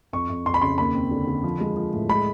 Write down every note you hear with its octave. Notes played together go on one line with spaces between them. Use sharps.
F2 C#6
F2
F2 C6
B5
C#3 C6
D#2 B5
C4
D3
D3
F3
G#3
F3
A2
G#3 B5